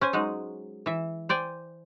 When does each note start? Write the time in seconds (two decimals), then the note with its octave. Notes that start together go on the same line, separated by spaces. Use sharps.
0.01 C#4 C5 G#5
0.13 F#3 G#3 D#4
0.86 E3 E5
1.29 C5 D5 G5 G#5